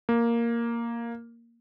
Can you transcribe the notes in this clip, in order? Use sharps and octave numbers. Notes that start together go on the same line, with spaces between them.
A#3